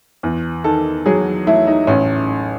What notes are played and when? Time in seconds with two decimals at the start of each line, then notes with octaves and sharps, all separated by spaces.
0.23 E2
0.64 D#3 A4
1.06 F#3 G#4
1.47 A3 E4
1.67 D#4
1.87 A1 C#4